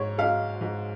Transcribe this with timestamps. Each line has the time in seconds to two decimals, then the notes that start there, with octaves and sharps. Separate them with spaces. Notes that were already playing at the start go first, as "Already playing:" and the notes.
Already playing: G#2 C#5
0.18 G#3 F5
0.61 G#2